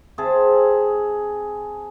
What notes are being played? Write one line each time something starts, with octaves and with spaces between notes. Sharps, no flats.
C4 G#4 E5 A5